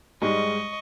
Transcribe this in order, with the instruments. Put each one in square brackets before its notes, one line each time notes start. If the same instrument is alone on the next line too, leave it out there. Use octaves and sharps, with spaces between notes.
[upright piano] G#2 G3 G#3 [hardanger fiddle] D#5 C#6